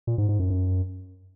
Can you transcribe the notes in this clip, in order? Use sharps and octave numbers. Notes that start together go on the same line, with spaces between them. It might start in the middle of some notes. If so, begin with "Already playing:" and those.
A#2
G#2
G#2
F#2
F#2